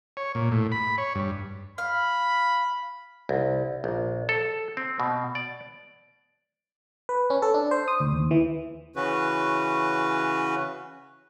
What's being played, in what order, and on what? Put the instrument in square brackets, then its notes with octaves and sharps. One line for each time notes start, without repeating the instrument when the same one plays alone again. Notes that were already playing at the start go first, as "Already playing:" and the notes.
[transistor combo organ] C#5
A#2
A2
B5
C#5
G2
[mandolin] F5 [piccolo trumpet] B5
[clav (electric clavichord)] C2
A#1
A4
C4
B2
D5
[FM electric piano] B4
C#4
A4
D4
C5
D#6
D2
D#2
E3
[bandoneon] C#3 E3 C#4 F#4 B4